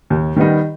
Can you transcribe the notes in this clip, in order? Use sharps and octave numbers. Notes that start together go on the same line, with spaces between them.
D#2
D#3 G3 B3 D#4